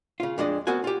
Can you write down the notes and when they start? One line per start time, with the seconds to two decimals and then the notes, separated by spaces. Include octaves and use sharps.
0.20 C#3 F4
0.38 F2 G#3 D4 D#5
0.67 B3 C4 F#4 A#4 F#5 G#5
0.84 F4 G4